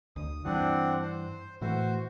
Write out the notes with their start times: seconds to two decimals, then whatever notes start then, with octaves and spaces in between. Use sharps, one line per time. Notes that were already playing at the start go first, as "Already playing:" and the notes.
0.16 D2 D#6
0.45 G2 E3 C4 D4 F#5
1.02 C5
1.61 A2 E3 A3 F#4 C5